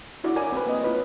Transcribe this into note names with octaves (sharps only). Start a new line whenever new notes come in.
D4 E4 F#4 D5
A#4 C#5 D5 G#5
C4 B4
A#3 D#5
C#4 F4 B4 C#5